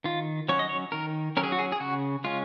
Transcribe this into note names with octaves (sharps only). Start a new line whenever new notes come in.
D#3 F4
F#3 C#4 C#5
D#5
C#5
D#3 A#4
F#3 C#4 A#4
G#4
F#4
G#4
G#4
C#3 F#4
G#3 C#4 F4